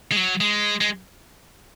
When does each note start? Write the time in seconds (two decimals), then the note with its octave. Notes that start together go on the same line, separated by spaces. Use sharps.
0.12 G#3
0.17 F#3
0.41 G#3
0.81 G#3